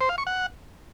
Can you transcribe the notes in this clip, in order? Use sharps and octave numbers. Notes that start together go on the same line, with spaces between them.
C5
F5
C#6
F#5